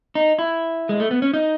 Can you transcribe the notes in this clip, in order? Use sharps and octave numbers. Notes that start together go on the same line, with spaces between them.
D#4
E4
G#3
A3
B3
C#4
D#4